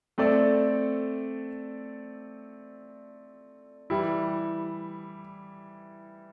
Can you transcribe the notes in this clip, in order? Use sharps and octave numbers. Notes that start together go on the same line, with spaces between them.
A3 C4 A4 D5
E3 G3 E4